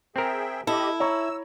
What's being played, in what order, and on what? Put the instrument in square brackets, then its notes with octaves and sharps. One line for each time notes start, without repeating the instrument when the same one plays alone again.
[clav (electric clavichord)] C4 A#4 [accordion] G#4 E5 G5
[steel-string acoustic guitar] E4 [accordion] G4 D#5 [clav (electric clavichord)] A4
[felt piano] C#5 A#5 C#6 [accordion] E6